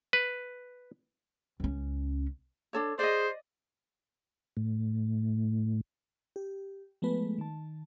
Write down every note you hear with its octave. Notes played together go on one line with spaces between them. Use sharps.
B4
C#2 C#4
D4 A4 C#5
G#4 C5 D5 D#5
A2
G4
F3 G#3 A3 B3 B4
D#3 A5